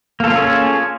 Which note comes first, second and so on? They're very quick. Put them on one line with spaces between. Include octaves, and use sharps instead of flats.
A#3 A4 F4 C#4 G#4